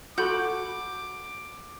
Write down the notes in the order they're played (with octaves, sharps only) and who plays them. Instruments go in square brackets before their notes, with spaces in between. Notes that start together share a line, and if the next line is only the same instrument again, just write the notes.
[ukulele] F#4 A4 B5 [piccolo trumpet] D6 [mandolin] G6